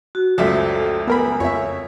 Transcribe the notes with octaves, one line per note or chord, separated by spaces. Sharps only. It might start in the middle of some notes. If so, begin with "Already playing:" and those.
F#4
C#2 F#2 F3 A3 F#4 A4 D5 E5
B3 A#4 G#5 B5
F2 C#5 E5